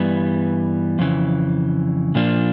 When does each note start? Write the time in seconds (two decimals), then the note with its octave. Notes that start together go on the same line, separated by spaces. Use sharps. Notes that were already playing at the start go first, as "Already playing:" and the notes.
Already playing: G2 E3 G3 B3
0.99 F2 C#3 E3
2.15 A#2 F3 A#3 D4 F4